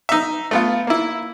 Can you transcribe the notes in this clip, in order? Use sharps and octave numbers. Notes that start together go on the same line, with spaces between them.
D#4 E5
A3 B3 F4
A#3 E4